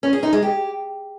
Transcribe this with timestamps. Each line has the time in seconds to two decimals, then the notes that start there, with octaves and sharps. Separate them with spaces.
0.03 C#4
0.13 G#4
0.23 D#4
0.33 G#3
0.42 G4